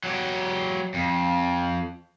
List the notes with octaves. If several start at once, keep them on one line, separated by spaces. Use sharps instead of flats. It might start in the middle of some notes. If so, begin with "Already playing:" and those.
F#3 G4
F2